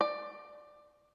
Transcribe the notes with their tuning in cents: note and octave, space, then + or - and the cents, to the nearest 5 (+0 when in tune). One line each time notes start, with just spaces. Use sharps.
D5 +15